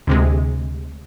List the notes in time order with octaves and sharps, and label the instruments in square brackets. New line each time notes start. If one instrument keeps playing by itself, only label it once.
[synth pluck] D2 C3 G#3